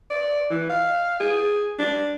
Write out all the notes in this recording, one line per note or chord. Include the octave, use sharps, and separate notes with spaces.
D5
E3
F5
G#4
D4